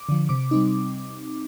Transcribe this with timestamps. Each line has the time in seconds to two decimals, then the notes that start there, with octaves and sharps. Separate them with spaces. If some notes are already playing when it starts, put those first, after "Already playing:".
Already playing: D6
0.09 D3 F3
0.29 C3 D6
0.51 G3 C4 D#4